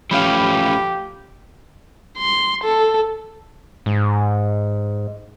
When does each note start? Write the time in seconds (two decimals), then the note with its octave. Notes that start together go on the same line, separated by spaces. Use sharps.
0.11 F3 A3 C#4 G4 F5 B5
2.18 C6
2.64 A4
3.86 G#2